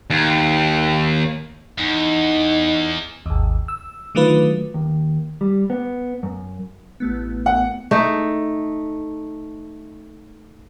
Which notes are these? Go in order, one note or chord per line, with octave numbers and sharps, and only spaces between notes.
D#2
E2 D#4
G#1 D#2
E6
D3 D#3 F#3 A3 F4 B4
D#2
G3
B3
F#2
A1 A3 B3
F#5
A3 D#4